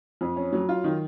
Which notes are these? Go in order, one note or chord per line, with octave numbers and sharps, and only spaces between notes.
F2
C#4
F#3
F4
D#3